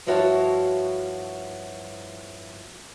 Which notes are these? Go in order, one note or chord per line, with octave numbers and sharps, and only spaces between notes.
G2 F3 E4 F#4 C#5 A5